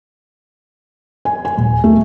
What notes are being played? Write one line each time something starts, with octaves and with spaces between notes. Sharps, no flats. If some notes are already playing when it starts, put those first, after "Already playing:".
G#5
G#5
D#1
A3